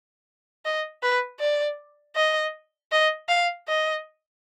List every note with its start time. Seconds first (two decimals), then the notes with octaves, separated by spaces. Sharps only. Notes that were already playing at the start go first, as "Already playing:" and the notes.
0.65 D#5
1.03 B4
1.40 D5
2.15 D#5
2.92 D#5
3.29 F5
3.68 D#5